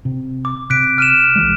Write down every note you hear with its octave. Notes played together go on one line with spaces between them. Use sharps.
C3
D6
C3 F#6 B6 D7
F6 D#7 E7
B1 E3 G#3